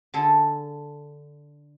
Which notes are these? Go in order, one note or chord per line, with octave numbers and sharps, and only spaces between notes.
D3 G#4 A4